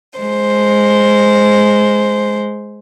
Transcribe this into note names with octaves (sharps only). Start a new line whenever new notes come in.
G#3 C5